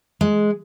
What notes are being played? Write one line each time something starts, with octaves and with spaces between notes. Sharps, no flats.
G#3